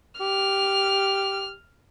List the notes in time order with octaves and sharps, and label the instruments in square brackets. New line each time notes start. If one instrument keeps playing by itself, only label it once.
[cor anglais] G4 [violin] F6